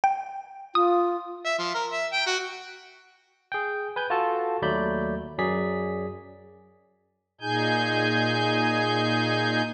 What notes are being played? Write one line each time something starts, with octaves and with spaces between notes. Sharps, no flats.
G5
F4 D#6
E5
F3
A#4
E5
G5
F#4
G#4 G5
B4 G#5 G6
F4 F#4 A4 A5
D#2 F#3 A3 D5 B5 G6
F#2 F#3 G#4 D5 B6
A#2 D#4 G#4 G#5 G6